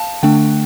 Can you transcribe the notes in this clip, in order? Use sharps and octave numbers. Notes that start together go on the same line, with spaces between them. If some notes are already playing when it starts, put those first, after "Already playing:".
Already playing: F5 A5
D3 A3 D4 G5